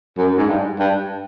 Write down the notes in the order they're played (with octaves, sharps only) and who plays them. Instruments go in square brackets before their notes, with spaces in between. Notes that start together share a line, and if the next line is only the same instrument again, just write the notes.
[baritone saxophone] F#2
G#2
G2
G2